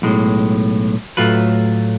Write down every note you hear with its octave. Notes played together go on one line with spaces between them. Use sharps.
B1 A2 G#3
A2 F#3 A3 F4 B4